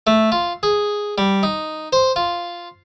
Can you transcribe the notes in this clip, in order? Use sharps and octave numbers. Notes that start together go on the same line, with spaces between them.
A3
F4
G#4
G3
D#4
C5
F4